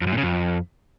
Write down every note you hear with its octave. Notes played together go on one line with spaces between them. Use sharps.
F2
F#2
A#2
C#3
F2